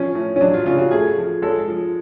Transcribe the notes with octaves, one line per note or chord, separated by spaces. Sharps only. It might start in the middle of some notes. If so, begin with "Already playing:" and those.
Already playing: F3 C#4
A2
C#4
F#3 D4
F4
C#3 F4
F#4
A3 G#4
F3
G#3 A4
F3